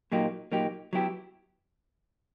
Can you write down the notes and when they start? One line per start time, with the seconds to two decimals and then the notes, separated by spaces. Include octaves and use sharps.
0.12 A#2 F#3 A#3 D#4 G4
0.52 A#2 F#3 A#3 D#4 G4
0.93 F#3 B3 E4 G4